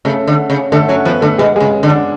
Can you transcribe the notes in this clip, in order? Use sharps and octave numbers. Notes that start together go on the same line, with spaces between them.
C#3 A3 A4
D3
C#3
D3 A3 A4
F#3 C#4 C#5
F3 B3 B4
D3 A3 A4
B2 G#3 G#4
G#3 G#4
C#3
D3
D4